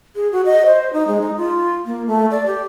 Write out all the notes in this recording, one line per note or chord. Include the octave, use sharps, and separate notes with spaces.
G#4
F#4
D#5
C5
D#4
G#3
D#4
F4
A#3
A3
D5
G4